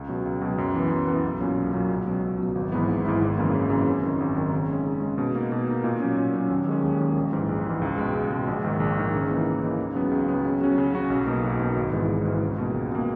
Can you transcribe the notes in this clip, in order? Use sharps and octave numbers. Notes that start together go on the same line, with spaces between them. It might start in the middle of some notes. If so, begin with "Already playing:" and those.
Already playing: C#2
B2 F#3
C#2
B2 F#3
F#2
E3 B3
F#2
E3 B3
B1
A#2 F#3 C#4
B1
A#2 F#3 C#4
C#2
B2 F#3
C#2
B2 F#3
G#1
G#2 E3 B3 E4
G#1
G#2 E3 B3 E4
G#1
F#2 C#3 E3 A#3
G#1
F#2 C#3 E3 A#3
G#1
F#2 D#3
G#1
F#2 D#3
C#3
G#3 C#4
C#3
G#3 C#4
B2
A#3 D#4
B2
A#3 D#4
A#2
F#3 C#4
A#2
F#3 C#4
D#2
D#3 G#3 C#4
D#2
D#3 G#3 C#4
A#1
G#2 E3
A#1
G#2 E3
C#2
B2 G#3
C#2
B2 G#3
A#1
G#2 D#3
A#1
G#2 D#3
C#3
E3 A#3 D#4
C#3
E3 A#3 D#4
C#2
C#3 F#3 B3
C#2
C#3 F#3 B3
C#3
F#3 C#4 F#4
C#3
F#3 C#4 F#4
B1
B2 A#3 D#4
B1
B2 A#3 D#4
G#1
G#2 E3 G#3
G#1
G#2 E3 G#3
C#2
B2 A#3
C#2
B2 A#3